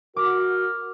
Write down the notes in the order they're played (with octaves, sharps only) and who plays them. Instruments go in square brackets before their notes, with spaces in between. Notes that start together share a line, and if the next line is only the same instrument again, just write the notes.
[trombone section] F#4 [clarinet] A#4 [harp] D6